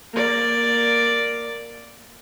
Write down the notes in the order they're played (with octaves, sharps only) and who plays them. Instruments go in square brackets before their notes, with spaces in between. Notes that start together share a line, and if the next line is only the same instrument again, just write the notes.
[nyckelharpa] A#3 D5